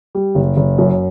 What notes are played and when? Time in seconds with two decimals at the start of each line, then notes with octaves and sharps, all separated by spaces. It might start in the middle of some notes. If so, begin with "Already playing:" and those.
0.15 G3
0.35 F#1
0.57 F#1
0.78 F#2